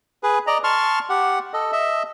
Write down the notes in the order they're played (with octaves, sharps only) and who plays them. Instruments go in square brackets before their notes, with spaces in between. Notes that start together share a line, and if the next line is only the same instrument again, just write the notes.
[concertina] G#4 B4
D5 D#5 A#5
A5 C6 C#6 F6
G4 F#5
A4 D#5
D#5 E5